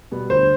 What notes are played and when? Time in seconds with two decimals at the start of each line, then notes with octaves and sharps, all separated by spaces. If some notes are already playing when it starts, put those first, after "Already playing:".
0.11 B2 G3 B3
0.30 D2 C5